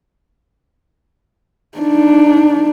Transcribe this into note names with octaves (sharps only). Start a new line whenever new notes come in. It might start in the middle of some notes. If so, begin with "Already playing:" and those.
D4 D#4